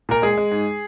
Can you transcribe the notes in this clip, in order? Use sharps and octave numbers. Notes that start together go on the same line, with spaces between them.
A#2 A#4
G#3 G#4
G#3
G#2